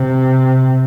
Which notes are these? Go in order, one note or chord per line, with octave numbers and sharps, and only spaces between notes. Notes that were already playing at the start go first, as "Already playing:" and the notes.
Already playing: C3